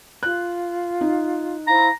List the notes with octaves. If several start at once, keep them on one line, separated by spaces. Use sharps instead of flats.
F4 F#6
D#4
E4 C5 F5 A#5